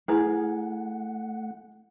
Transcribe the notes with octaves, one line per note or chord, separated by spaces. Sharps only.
A3 E4 G#4 B4 F#5 D#6